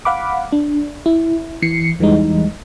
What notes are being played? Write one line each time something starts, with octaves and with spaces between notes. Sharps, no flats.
F5 F#5 B5 D6
D4
E4
E3 C7 C#7
E2 E3 G3 G#3 D#4